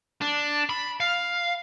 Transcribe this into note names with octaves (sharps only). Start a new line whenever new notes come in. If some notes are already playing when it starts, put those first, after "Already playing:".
D4
B5
F5